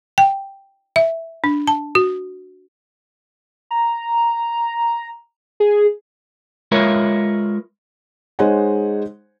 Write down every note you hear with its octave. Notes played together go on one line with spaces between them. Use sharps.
G5
E5
D4
A5
F#4
A#5
G#4
G#3 F4 A#4 B4 C#5 E5
G#3 D#4 C5 C#5 F#5 G#5